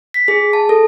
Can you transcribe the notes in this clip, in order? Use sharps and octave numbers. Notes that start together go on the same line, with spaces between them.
B6
G#4
A5
A4